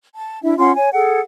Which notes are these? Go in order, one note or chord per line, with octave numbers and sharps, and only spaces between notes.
A5
D4 E4 E5
C#4 F4 F#5 C6
C#5 G#5
G#4 A4 F#5